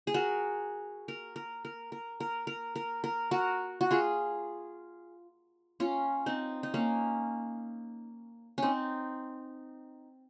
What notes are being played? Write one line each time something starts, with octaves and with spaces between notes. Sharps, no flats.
G#4
F#4 A#4
A#4
A#4
A#4
A#4
A#4
A#4
A#4
A#4
F#4 A#4
F#4
F4 G#4
C#4 F4
C4 D#4
D#4
A#3 C#4
C4 C#4 D#4